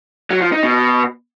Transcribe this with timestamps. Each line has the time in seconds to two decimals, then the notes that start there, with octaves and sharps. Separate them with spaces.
0.31 F#3
0.41 F3
0.52 D#4
0.63 B2